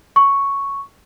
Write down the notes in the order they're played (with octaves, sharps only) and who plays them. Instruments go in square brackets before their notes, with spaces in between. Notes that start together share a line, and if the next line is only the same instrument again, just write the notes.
[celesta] C#6